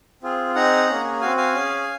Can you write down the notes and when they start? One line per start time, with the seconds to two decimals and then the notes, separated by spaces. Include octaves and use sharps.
0.22 C4 F4 G#4
0.55 C4 D#4 G#4 F#5 A#5
0.89 A#3 C#4 G#4
1.21 C4 F#4 F5 G#5
1.37 F5 G#5
1.54 C#4 G#4